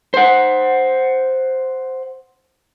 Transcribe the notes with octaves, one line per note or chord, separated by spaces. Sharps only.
C5 F#5